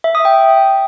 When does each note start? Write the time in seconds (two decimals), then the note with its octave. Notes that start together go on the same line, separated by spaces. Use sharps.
0.04 E5
0.15 D#6
0.25 G5